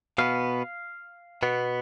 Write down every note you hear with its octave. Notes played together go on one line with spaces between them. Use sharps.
B2 B3 F5
B2 B3